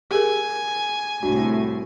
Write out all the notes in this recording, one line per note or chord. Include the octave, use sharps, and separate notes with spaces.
G4 G#4 A#4 G#5
C2 A2 D4 F#4